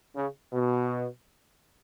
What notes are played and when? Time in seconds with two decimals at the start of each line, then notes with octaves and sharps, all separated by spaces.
0.16 C#3
0.53 B2